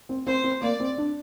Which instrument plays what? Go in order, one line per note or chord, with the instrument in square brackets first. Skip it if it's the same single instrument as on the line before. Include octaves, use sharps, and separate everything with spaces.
[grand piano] C4
[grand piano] C4 [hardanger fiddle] C5
[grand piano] C4
[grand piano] A#3 [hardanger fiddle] D5
[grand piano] C4
D4